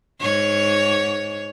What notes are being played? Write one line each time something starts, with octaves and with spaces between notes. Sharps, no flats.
G#2 C#5